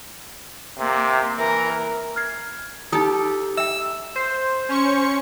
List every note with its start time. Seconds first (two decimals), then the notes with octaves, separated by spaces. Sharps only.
0.78 C3 A#3
1.38 E3 A#4
2.16 F6 G#6 C7
2.92 D#4 G4 A4 A#5 D#6
3.57 E5 G5 E6
4.16 C5
4.69 C#4 C#6 C#7